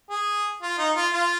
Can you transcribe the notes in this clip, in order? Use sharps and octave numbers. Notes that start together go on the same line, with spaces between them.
G#4
F4
D#4
F4
F4